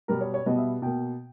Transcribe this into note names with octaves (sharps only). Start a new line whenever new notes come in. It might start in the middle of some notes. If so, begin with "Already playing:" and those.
B2 G3 B3 A#4
C#5
C#5
B2 G3 B3 D#5
E5
B2 A#3 G5